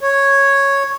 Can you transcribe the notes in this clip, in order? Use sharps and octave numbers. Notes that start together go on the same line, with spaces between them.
C#5